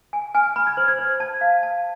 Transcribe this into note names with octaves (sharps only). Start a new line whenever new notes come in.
G#5
G#5 F6
B5 F6
G#6
C5 F6
G#6
C5 F6
A5 G#6
F5
A5